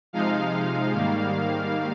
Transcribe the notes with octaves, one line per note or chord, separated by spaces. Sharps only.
C3 F3 G#3 D#4 F5
G#2 D#3 G3 A#3